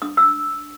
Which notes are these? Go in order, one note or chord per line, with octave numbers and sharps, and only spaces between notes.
D4 D#6
E6